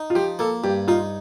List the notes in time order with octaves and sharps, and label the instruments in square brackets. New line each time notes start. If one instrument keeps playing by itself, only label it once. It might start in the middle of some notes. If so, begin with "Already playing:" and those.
Already playing: [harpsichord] D#4
[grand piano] F4
[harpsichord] F3 [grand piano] G4
[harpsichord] A#3 [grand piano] A4
[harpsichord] G2 [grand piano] G4
[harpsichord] D#4 [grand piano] F4